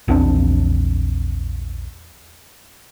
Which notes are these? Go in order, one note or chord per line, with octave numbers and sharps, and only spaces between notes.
A#1 E2 C4 D4